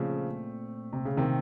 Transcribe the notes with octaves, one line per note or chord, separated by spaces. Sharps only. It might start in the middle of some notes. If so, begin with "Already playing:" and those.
Already playing: A#2 C#3 F3 A3 C4
C3
C#3
C3 D#3